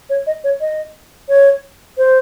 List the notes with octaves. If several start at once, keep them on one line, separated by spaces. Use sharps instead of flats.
C#5
D#5
C#5
D#5
C#5
C5